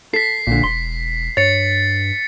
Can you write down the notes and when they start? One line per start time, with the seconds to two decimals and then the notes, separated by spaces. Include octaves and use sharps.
0.14 A4 B6 C7
0.47 A#1 A#2 D3
0.63 E1 C6
1.37 G2 C#5 A6 C#7